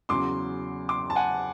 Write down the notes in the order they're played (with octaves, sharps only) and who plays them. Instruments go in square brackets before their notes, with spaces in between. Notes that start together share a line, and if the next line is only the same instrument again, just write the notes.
[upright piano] E2 C#3 F#3 C6 D6
C6 D6
A5
F#5 G#5